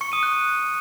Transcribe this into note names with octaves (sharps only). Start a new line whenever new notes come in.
C#6 C#7
D#6 D#7
F#6